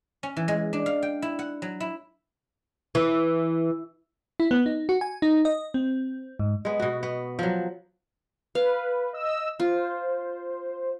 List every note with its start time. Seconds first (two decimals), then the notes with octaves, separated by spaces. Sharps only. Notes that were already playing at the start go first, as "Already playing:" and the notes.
0.23 C#4
0.37 E3
0.48 G#3
0.73 D4
0.86 F5
1.02 G5
1.22 E4
1.39 F#5
1.62 F#3
1.80 E4
2.95 E3
4.40 E4
4.51 B3
4.66 D#4
4.89 F#4
5.01 G#5
5.22 D#4
5.45 D#5
5.74 C4
6.39 G#2
6.65 G#3 B3
6.80 B2 F#4
7.03 B3
7.39 F3 F#3
8.55 B4 F5
9.13 D#5 E6
9.60 F4 C5